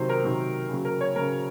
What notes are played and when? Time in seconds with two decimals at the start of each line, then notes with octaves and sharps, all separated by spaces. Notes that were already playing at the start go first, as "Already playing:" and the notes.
Already playing: C3 D#3 F#3 C5
0.09 A#4
0.24 C3 D#3 F#3
0.69 C#3 F#3
0.85 A#4
1.01 C#5
1.16 C#3 F#3 A#4